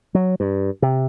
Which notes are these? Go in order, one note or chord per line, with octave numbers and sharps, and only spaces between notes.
F#3
G2
C3